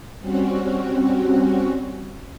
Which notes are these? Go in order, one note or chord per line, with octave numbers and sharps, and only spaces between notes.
G3 C4 C#4 F#4